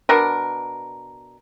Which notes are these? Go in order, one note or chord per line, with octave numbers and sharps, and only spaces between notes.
B2 D4 A#4